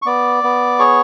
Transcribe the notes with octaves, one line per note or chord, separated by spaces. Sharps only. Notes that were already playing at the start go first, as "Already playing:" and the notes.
C#6
B3 D5 D6
B3
G#4 C#5 C#6